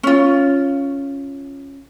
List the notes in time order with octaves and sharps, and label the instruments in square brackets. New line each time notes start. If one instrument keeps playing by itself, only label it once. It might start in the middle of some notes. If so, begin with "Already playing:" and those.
[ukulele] C#4 F4